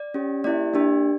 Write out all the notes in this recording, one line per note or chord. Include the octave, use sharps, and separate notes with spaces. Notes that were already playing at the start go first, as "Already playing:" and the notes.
Already playing: D5
C#4 G4
A#3 E4 G4 D5
A#3 D4 G4